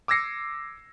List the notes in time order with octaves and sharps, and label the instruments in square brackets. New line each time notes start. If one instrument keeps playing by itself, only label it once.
[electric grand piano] D6 E6 G#6 A#6 C7 C#7